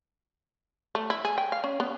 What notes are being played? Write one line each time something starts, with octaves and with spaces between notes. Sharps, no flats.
A3
E4
G#4
G5
F5
C#4
B3